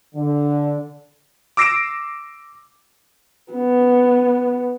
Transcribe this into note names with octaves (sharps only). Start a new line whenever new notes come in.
D3
D6 E6 A#6 C7 D7 E7
B3